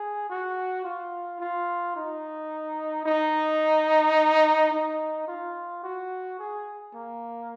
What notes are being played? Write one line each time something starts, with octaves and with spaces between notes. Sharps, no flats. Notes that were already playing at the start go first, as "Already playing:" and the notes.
Already playing: G#4
F#4
F4
F4
D#4
D#4
D#4
F4
F#4
G#4
A#3